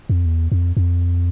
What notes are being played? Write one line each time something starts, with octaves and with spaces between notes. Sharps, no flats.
F2
E2
F2
F2